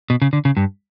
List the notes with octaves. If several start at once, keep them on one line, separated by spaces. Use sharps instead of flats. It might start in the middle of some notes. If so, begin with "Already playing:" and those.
B2
C#3
D3
C#3
G2